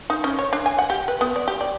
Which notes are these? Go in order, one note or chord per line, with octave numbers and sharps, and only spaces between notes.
D#4
C#4
C#5
D4
G#5
F#5
G4
B4
B3
D5
G4
D5